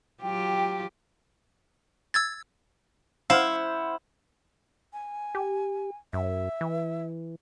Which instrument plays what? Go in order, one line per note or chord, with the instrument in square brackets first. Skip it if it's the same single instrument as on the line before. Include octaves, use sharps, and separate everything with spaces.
[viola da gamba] F#3 F4 G4 [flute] G5
[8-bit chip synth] E6 G#6 A6
[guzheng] E4 [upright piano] C5 F#5 F6 [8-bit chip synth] F5
[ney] G#5
[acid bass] G4
[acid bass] F#2 [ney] E5
[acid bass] E3